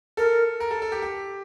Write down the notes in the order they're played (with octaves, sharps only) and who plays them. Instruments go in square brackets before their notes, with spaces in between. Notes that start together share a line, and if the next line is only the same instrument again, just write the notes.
[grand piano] A4 [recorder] A#4
[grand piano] A#4
A4
A4
G4
G4